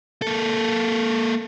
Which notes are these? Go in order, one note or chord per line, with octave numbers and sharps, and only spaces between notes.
A#3 A4